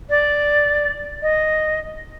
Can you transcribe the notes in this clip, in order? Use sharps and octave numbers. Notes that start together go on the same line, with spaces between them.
D5
D#5